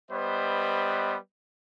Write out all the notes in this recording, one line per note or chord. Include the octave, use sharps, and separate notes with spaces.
G3 B3 B4 C5 D#5